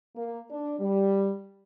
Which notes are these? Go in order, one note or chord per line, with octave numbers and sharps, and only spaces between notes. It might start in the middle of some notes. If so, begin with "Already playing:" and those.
A#3
D4
G3